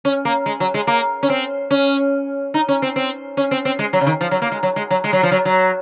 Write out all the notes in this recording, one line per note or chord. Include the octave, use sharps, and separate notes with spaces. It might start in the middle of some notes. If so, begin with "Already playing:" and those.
C#4
A#3
G#3
F#3
G#3
A#3
C#4
C4
C#4
D#4
C#4
C4
C4
C#4
C4
C4
G#3
F#3
C#3
D#3
F3
F#3
A#3
G#3
F#3
G#3
F#3
G#3
F#3
F3
F#3
F#3